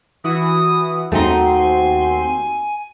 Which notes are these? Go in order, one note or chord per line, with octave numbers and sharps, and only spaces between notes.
E3 E4 F#4 D#6
D#2 A3 C4 D#4 F#4 G#5 C6